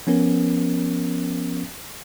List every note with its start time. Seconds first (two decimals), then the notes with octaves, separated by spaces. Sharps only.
0.07 F3 B3 C#4 A#4